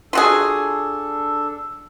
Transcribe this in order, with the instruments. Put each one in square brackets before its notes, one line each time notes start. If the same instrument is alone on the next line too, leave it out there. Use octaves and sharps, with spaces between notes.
[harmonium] D4 A4 [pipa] F4 F#4 G#4